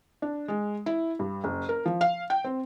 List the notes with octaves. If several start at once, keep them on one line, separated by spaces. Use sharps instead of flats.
D4
G#3
E4
G2
F#1
A#4
F3
F5
G5
C4